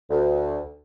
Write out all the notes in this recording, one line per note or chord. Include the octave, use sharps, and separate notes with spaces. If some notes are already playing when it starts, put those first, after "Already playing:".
D2